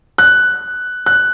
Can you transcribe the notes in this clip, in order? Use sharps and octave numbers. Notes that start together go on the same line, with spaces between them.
F#6
F#6